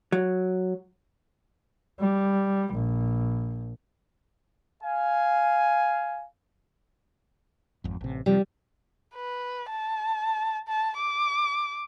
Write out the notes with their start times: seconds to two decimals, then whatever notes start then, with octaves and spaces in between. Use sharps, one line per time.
0.12 F#3
2.00 G3
2.74 A#1
4.83 F5 G#5
7.84 G#1 F2
8.01 A1 C3
8.26 C3 F3 G3
9.15 B4
9.70 A5
10.68 A5
10.97 D6